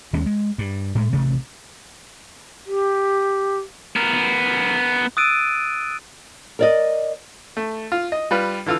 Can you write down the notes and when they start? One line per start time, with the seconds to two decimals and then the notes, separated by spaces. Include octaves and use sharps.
0.13 D#2 D#3 G#3 C#4
0.26 G#3
0.58 G2
0.95 A2 G#3 A3
1.13 A1 C3 A3
2.66 G4
3.96 B3 A#4
5.17 D#6 E6 F#6 A6 D7 D#7
6.59 A#4 D5 D#5
7.57 A3
7.92 F4
8.12 D#5
8.31 G3 F4 B4
8.66 D3 E3 F4 F5 E6